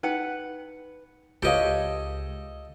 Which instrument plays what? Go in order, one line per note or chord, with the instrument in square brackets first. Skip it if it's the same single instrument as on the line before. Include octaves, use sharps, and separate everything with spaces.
[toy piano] D#4 G5 [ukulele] B4 F#5
[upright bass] C#2 [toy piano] F4 B4 F5 [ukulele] G4 C#5 [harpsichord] A4 D#5